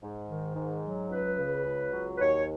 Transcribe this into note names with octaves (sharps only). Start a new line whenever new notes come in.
G#2
D#3
G#2
F#3
C#2 B4
C#3
C#2
F#3
B4
D#2 C#5